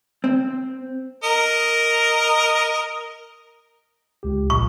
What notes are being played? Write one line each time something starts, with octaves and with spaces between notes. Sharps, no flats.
C4
A#4 D#5
C#2 G4
A#1 A#2 C#6